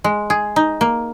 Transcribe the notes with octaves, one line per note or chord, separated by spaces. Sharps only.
G#3
G#4
D#4
A#3